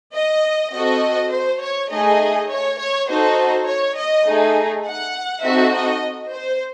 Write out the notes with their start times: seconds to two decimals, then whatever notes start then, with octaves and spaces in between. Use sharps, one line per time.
0.14 D#5
0.73 C4 F#4 A4 D#5
1.32 C5
1.61 C#5
1.91 A3 D#4 G#4 D#5
2.49 C#5
2.79 C#5
3.08 D#4 F#4 A4 C5
3.67 C#5
3.97 D#5
4.26 A3 D#4 G#4
4.85 F#5
5.43 C4 D#4 F#4 A4 E5
5.74 D#5
6.32 C5